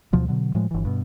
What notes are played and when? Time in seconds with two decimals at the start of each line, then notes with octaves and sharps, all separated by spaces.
0.13 D2 B2 F3 F#3
0.28 B2 D3 F#3
0.55 A2 F3 G#3
0.71 G1 E3
0.85 G2 B2